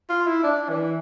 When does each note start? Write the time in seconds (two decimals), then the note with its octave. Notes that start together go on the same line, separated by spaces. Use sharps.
0.09 F4
0.27 E4
0.43 D4
0.69 E3